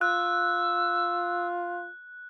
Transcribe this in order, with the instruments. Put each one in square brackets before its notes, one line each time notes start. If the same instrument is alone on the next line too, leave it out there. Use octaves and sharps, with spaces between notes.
[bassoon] F4 [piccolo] E6 [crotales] F#6